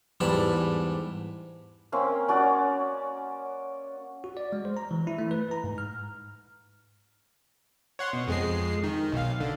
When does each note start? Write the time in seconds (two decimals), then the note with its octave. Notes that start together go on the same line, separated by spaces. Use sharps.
0.20 E2 G#2 G3 A5 B5
1.92 A#3 C4 C#4 C6
2.28 C#4 F#4 D5
4.24 F#4
4.37 D5
4.52 G#3
4.65 C5
4.77 A#5
4.91 E3
5.07 E4
5.19 A3
5.31 B4
5.51 A#5
5.64 G#2
5.78 F6
7.99 C#5 F#5 C6
8.13 B2
8.28 F2 G#3 C7
8.83 D#3
9.12 B1 F5
9.40 D3